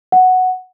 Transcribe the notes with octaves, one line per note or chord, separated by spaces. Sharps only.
F#5